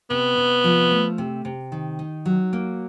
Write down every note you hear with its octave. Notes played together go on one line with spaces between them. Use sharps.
C3 B3
C3
F3
A3
C3
C3
D#3
D#4
F#3
A#3